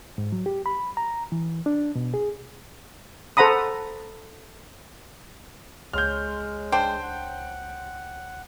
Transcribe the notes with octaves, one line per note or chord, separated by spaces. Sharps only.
G#2
F#3
G4
B5
A#5
E3
D4
B2
G#4
A4 C5 F#5 A#5 B5 D#6
C#2 G#3 C#5 C6 F6 G6
D4 C5 G5
F#5